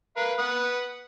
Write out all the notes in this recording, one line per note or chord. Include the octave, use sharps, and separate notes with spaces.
A#4 B4 F5
B4 F#5 D#6